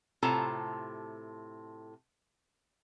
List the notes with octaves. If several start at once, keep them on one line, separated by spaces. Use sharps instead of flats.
A2 C3 F4 A4 A5 A#5